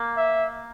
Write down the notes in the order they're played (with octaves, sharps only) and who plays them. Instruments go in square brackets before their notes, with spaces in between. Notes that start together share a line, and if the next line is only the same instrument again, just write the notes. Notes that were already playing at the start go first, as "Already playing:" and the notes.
Already playing: [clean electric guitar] A#3
[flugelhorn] E5